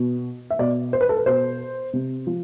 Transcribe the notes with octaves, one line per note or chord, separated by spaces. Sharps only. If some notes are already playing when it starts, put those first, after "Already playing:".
Already playing: B2
E5
B2 D5
C5
B4
A4
B4
B2 C5
C3
F3